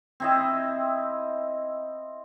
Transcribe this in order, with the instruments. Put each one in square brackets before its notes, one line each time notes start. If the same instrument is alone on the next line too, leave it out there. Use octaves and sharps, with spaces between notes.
[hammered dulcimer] C4 E4 D#5